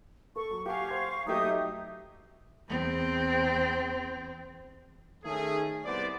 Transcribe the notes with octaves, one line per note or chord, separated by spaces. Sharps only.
A4 C#6
F#3
G4 F5 F#5 G#5 C#6
C5 G#6
F#3 A3 D#4 G4 E5 D#6
E2 C4
D#3 A3 C#4 G#4
C2 B3 C5 D5